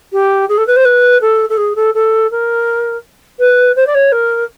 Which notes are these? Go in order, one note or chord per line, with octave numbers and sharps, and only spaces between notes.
G4
G#4
A4
B4
C5
B4
A4
A4
G#4
A4
A4
A#4
B4
C5
D5
C#5
A#4